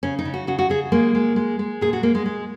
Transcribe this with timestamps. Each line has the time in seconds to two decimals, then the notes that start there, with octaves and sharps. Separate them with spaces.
0.03 C#3 C#4
0.19 D#4
0.25 C#3
0.34 F#4
0.47 C#3 F#4
0.59 F#4
0.69 C#3 G#4
0.92 G#3 A#3
1.15 G#3
1.36 G#3
1.59 G#3
1.81 A#2 G#4
1.93 F#4
2.03 G#3 A#3
2.15 G#3
2.26 G#3